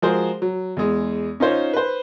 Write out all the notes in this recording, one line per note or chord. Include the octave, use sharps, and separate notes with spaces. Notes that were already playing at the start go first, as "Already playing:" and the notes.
F3 G#3 F#4 G#4 A#4 C5
F#3
E2 G#3
C#4 D#4 F4 C5 C#5
B4 C5